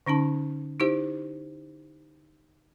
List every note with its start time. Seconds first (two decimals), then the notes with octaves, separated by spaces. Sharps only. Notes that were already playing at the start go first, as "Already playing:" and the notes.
0.06 D3 C#4 D#4 A5
0.80 D#4 E4 G4 C5